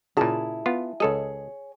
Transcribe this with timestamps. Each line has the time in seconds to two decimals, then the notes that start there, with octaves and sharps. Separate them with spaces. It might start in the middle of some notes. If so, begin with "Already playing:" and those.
0.17 A#2 C#3 E4 G#4 A5
0.66 B3 F4
1.00 C#2 G#4 A4 C#5 D#5